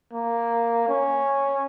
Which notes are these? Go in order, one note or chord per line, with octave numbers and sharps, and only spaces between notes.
A#3
C#4